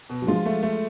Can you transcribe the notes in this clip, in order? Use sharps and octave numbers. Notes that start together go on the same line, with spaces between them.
B2
F#3
F3 G#3 F4
A3
A3